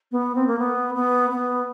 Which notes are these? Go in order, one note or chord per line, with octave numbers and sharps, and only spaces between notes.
B3
C4
A#3
B3
B3
B3